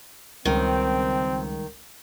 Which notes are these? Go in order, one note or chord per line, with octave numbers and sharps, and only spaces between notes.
C#2 D#3 G3 G#3 C4 A#4